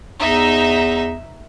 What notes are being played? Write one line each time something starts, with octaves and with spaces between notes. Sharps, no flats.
E2 D#4 E5